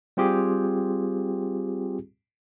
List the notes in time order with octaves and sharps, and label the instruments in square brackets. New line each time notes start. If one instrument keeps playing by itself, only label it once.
[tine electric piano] G3 C4 F4 G4 G#4